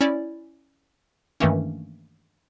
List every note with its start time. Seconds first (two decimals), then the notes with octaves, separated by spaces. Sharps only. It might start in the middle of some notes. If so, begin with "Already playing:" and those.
0.01 C#4 E4 D5
1.40 G2 D#3 E3 A3 A#3 C#4